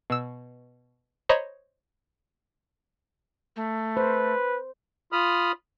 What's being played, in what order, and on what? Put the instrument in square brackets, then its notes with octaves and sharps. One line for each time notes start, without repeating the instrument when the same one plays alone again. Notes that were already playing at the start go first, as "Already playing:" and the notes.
[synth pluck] B2 E6
C5 C#5 D#5 A#5 B5
[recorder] A3
[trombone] B4 [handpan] C5
[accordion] F4 B5 D#6 F6